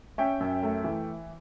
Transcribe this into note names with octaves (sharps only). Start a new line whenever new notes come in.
C#4 E5 G5
F#2
A3
E3